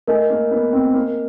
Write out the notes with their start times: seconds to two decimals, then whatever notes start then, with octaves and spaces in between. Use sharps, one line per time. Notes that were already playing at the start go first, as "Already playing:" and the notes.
0.07 A3 A#4 D#5 G#5
0.30 A#3
0.51 B3
0.73 C4
0.94 A#3